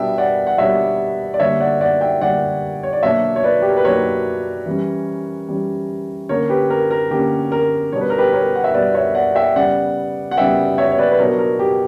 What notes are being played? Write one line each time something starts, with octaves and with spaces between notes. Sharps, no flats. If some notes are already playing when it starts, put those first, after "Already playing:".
Already playing: B2 G3 B3 D4 E5 G5
D5 F#5
F#5
B2 G3 B3 D4 C#5 E5
D5
D3 G3 A#3 C#5 E5
D5 F#5
D5 F#5
E5 G5
D3 G3 A#3 D5 F#5
C#5
D5
B2 F#3 A#3 D4 C#5 E5
C#5
B4 D5
G4
A#4
B4
B2 F#3 A#3 D4 A#4 C#5
E3 G3 C#4
E3 G3 C#4
D3 A#3 C#4 A#4 C#5
G4 B4
A#4
A#4
D3 A#3 C#4 G4
A#4
B2 G3 B3 D4 C#5
B4
A#4
G4 B4
A#4 C#5
F#5
E5
B2 G3 B3 D4 B4 D5
C#5 E5
D5 F#5
E5 G5
C#3 G3 B3 D5 F#5
F#5
C#3 G3 B3 E5 G5
C#5 E5
C#5
B4 D5
B4
B2 F#3 B3 D4 A#4 C#5
A#4
G4